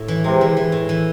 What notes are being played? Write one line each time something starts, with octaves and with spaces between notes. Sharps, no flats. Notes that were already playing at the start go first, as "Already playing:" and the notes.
Already playing: A2
E3
C3 G#3
E3
E3
A2
E3